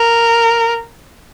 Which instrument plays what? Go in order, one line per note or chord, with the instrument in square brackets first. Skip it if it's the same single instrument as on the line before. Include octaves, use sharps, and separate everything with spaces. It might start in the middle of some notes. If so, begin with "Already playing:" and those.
Already playing: [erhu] A#4